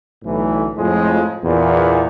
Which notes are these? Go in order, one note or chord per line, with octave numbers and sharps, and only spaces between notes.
B1 A2 D3 E3
F2 A2 F3 G#3
E2 A#2